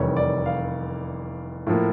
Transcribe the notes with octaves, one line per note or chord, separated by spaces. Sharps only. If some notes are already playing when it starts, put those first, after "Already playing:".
Already playing: F1 E2 C3 D#3 G3 C#5
D5
F5
A2 F3 A#3